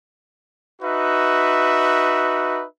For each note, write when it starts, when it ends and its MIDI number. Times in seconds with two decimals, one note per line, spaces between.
0.82 2.64 63
0.82 2.64 66
0.82 2.64 71
0.82 2.64 76